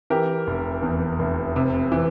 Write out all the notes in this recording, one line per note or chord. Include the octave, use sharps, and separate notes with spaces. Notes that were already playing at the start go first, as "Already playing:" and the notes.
E3 G4 A#4
F1
E2
F1
C3
E3